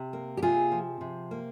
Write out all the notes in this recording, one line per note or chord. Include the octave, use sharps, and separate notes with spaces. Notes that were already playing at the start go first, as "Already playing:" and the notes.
Already playing: C3
A#3
G4
C3 F4 G#4
F3
C3
A#3